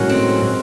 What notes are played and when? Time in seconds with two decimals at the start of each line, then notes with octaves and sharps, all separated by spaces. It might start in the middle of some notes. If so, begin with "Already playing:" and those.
Already playing: A2 D#3 F#3 G#3 C#4 F#4
0.09 C4